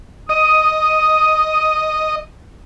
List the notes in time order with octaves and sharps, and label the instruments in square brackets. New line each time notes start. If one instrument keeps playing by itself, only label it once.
[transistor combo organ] D#5 [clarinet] D#6